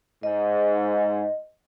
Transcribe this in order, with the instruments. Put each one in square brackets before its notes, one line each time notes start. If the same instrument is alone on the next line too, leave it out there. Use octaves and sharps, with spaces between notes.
[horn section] G#2 [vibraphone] D#5